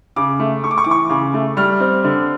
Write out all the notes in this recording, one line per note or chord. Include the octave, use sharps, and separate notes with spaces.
C#3 D6
A3
A3 C#6
D6
C#6
E3 D6
C#6
C#3 D6
A3
G3 F6
C4
D3